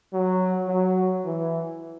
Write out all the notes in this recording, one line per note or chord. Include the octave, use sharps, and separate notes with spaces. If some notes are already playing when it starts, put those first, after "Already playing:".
F#3
F#3
E3